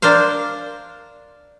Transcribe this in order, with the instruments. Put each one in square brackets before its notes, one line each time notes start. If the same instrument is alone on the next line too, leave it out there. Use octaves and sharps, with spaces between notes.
[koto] D4 A#4 C5 F5